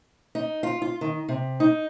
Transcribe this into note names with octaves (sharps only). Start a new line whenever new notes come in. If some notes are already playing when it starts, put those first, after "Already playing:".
D#4
F4
F4
D#3
C3
D#4